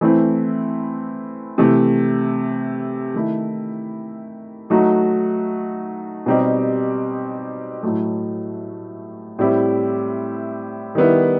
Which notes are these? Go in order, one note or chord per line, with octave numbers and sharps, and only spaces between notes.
E3 A3 C4 E4
C3 E3 A3
D#3 A3 E4
F#3 A3 D#4 F#4
B2 G3 C4 D#4 G4
A2 F#3 A3
A2 G3 C4 E4 G4
D#3 G3 B3 E4